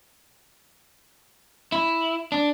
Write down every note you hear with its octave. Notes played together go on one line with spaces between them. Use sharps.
E4
D4